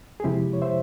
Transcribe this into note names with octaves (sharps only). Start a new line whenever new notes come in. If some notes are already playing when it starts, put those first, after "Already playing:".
G#4
F2 C3 F3 G#3 E4 G4
C#5
C5 E5